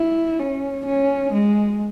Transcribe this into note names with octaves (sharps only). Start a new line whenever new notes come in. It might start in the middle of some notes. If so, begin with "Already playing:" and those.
Already playing: E4
C#4
C#4
G#3